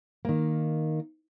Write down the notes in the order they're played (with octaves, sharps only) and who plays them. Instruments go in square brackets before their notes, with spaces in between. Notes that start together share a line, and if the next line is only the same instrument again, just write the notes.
[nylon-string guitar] D#3 A#3